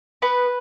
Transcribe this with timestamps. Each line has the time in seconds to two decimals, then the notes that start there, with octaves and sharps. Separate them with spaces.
0.22 B3 B4 B5